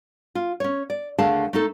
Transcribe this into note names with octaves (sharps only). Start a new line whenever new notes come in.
F4
C#4 C#5
D5
D#2 D3 A3 G#4 F5 A5
A3 D#4 A4